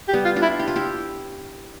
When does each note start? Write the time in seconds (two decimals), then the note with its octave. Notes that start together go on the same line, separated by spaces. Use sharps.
0.08 G4
0.13 G3 B3
0.25 F4
0.36 D4 F4
0.42 E4
0.59 G4
0.68 F4
0.76 E4 G4